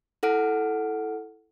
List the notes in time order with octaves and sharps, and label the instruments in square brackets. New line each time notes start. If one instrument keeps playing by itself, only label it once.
[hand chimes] E4 A4 F#5 F6 D7